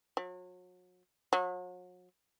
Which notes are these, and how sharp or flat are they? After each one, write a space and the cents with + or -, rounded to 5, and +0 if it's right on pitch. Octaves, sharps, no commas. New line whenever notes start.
F#3 -35
F#3 -40